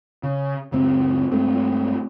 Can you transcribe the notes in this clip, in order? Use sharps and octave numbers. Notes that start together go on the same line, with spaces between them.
C#3
F#1 C#2 C4
G2 G#3 A3 C4